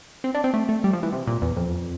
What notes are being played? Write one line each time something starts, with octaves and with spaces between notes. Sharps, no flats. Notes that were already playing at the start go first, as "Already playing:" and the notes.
C4
D4
C4
A3
A3
G3
F3
E3
C3
A#2
E2
F2